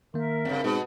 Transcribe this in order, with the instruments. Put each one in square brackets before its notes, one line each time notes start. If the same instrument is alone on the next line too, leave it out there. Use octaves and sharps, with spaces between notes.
[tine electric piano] D#3 A#3 [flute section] A#4 E5
[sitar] G2 C#3 [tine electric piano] C4
[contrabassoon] G#2 [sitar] B2